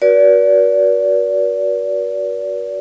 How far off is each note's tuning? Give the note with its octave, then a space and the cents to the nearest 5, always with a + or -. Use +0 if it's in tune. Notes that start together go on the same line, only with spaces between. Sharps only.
F#4 +10 B4 -45 D5 -30